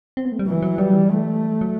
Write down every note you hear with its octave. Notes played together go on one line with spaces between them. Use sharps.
C4
B3
A3
G3
E3 F#3
F#3
F#3 G3
E3
A3
F#3